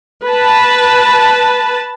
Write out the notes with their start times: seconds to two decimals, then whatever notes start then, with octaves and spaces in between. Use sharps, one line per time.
0.25 B4 A5